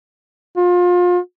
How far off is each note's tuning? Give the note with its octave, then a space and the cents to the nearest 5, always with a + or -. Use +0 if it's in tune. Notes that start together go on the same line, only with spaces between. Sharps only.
F4 +30